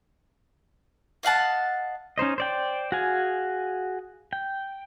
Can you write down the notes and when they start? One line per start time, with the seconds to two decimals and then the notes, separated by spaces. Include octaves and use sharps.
1.23 D#5 F5 F#5 A5
2.18 C#4 D#4 C5 D#5
2.38 C5 D5 G5
2.92 F#4 G#4 F5 G#5
4.33 G5